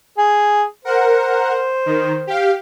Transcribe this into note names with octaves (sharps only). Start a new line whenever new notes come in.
G#4
A#4 C5 F#5
D#3
G4 F5